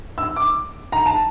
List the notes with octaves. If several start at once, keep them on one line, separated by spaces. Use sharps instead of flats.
E6
D6
A#5
A5